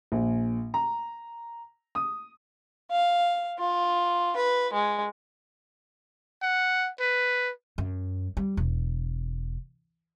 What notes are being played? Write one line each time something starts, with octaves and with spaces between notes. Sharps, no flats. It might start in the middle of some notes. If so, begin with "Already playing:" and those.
A#1
A#5
D#6
F5
F4
B4
G#3
F#5
B4
F#2
G3
E1